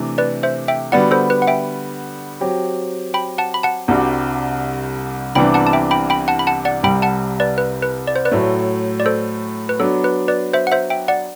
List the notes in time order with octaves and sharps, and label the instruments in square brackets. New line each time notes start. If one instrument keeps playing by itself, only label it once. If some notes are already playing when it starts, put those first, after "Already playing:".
Already playing: [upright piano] C3 E3 A3 D4
[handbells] B4 D5
C5 E5
E5 G5
[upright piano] D3 G3 B3 F#4 [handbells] D5 F#5
[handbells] A4 C5
B4
F#5
E5 G5
[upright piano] F#3 C4 G4
[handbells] G5 B5
F#5 A5
B5
F#5 A5
[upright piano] C2 C3 G3 D4 F#4
[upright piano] C2 C3 E3 B3 D4 [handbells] G5 B5
[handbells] F#5 A5
A5
E5 G5
G5 B5
G5 B5
F#5 A5
B5
F#5 A5
D5 F#5
[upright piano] C2 C3 G3 [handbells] G5 B5
[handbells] F#5 A5
B4 D5
B4
B4
D5
C5
B4 D5
[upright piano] A2 F#3 A3
[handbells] D5
A4 C5
B4
[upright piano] F#3 B3 D4 [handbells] A4
[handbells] B4
B4 D5
C5 E5
F#5
C5 E5
E5 G5
D5 F#5